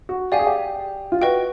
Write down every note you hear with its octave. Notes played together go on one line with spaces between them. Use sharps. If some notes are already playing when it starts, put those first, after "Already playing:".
F#4
G4 D5 F5 G#5
G#4
G4
F4
F#4 B4 D#5 G5